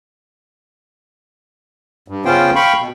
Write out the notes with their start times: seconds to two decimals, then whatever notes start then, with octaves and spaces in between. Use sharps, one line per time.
2.08 G2
2.25 C#3 B3 C#4 F4 C5 G5
2.55 F5 G5 B5 C#6
2.80 B2